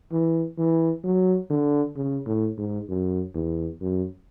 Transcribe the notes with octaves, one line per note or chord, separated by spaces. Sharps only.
E3
E3
F#3
D3
C#3
A2
G#2
F#2
E2
F#2